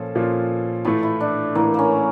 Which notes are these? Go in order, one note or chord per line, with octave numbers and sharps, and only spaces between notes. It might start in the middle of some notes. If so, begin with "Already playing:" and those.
Already playing: A#2 F3 C#4 A4
A#2 F3 C#4
A2 E3 A3 F4
E4
D4
A2 E3 A3 A#3
A#3 C#4